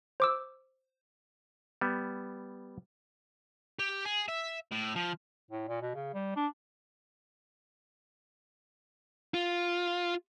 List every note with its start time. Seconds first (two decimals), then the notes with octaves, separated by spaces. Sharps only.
0.20 C5 D6 E6
1.81 G3 B3
3.79 G4
4.05 G#4
4.28 E5
4.72 A2
4.96 F3
5.51 A2
5.69 A#2
5.82 B2
5.95 C#3
6.14 G3
6.36 D4
9.34 F4